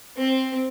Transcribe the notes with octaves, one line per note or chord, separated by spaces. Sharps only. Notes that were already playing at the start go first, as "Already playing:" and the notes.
C4